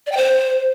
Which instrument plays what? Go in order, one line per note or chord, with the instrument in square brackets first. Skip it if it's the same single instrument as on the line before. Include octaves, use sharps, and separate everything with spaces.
[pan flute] D5
G5
C5